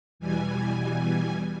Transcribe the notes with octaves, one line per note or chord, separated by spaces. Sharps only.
E2 B2 E3 G3 G#5